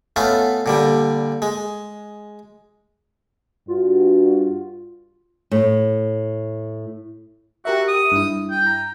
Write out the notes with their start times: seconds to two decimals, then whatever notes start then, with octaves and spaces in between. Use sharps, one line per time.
0.16 A3 B3 C#4 F4
0.66 A#2 D3 G3
1.42 G#3
3.68 G2 F4 F#4
5.52 A2
7.65 F#4 G4 A#4 E5
7.88 D#6
8.12 G2 E4
8.51 G5
8.67 A#5